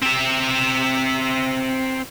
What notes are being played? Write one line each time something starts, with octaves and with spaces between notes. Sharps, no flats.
C4 E5